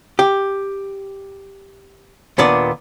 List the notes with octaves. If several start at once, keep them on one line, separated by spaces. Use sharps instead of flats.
G4
D#2 A#2 B3 D4 D5